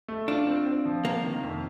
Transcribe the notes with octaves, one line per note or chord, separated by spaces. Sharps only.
A3
D4 F4
C4
C4
F3
C3 A#3
D#3
F2